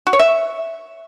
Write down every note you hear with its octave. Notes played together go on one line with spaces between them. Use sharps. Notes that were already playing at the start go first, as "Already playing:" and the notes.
F#4
C#5
E5